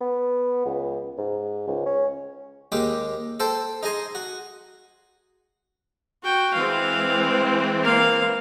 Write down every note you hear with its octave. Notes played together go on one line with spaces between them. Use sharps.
B3
C#2
G#2
C#2
C#4
D#2 G#3 G4 D6
A4 C5 G5 A5
D#4 G#4 D#5 G#5 C6
F#4
F#4 G5
E3 G#3 C4 F5
A#3 F5